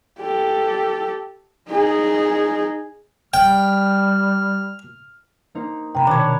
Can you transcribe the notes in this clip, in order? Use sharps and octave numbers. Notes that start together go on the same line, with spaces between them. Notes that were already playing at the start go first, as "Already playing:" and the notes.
G4 A4
D#4 G#4
G3 G5 F6
A#3 D#4 C5
C3 A#3 G5 A#5 B5
B2 D#3 D4 C#5